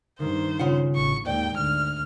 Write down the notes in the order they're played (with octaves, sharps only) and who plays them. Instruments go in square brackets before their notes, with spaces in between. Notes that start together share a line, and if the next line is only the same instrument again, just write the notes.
[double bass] G2 D#3 [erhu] C5
[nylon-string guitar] C#3 F4 F#5
[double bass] A1 [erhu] C#6
[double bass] D#2 G#2 [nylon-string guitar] D5 [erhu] G5
[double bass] D2 [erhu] F6